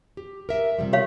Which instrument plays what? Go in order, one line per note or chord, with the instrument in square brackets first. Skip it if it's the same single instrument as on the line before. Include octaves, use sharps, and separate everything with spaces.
[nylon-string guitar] G4
A#4 E5
C3 F3 G3
[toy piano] G4 C#5 F5